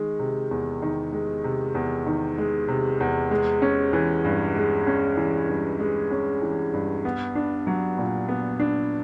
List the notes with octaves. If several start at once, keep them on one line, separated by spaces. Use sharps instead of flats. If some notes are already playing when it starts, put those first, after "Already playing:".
Already playing: D#3 G#3
C3
E2
D#3
G#3
C3
E2
D#3
G#3
C3
E2
G#3
C#4
E3
G2
G#3
C#4
E3
G2
G#3
C#4
E3
G2
B3
D4
F#3
A#2
B3
D4